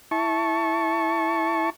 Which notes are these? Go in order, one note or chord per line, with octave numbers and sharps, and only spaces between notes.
E4 A5 C#6